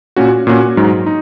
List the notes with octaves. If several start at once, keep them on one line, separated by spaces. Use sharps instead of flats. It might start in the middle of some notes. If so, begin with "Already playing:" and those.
A#2 A#3 C#4 F#4
A#2 A#3 C#4 F#4
G#2 F#3 D#4
D#4